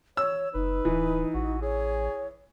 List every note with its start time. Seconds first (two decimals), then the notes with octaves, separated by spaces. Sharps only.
0.17 C#5 E6
0.54 F#1 D#4 B4
0.85 D1 E3
1.34 A1 F#4
1.62 G#4 C#5